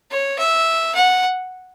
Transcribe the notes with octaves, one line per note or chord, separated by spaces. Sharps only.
C#5
E5
F#5